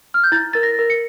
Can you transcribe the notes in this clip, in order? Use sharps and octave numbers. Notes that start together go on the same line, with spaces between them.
F6
G6
E4 A6
A#4 A6
A#6
A#4
C#7